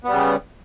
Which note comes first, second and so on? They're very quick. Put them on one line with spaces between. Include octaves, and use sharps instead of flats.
B3 G3 C#3